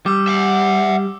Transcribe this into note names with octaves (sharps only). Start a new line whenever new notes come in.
G3 D6 E6
E5 F#5